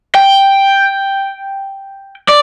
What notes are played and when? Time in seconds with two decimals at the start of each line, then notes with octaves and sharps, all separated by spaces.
0.15 G5
2.28 D5